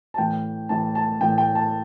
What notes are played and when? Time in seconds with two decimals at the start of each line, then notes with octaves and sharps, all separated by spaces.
0.14 A5
0.18 A2 E3 G5
0.69 A2 E3 A5
0.95 A5
1.21 A2 E3 G5
1.38 G5
1.55 A5